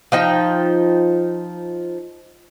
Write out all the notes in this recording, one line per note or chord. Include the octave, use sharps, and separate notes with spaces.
F3 D#4 G5